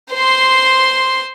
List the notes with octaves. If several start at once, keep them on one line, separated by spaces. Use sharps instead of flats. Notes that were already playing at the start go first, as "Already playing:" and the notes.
C5 C6